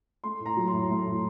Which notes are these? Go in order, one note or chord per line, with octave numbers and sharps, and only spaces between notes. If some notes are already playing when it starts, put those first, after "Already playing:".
A3 C6
A2
A#5
F#3
C6
A2
A3
A2